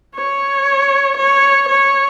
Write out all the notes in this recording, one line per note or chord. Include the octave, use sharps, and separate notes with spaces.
C#5
C#5
C#5